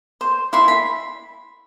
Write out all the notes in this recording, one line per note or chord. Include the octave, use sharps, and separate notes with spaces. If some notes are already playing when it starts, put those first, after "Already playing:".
C5
E4 C6
B5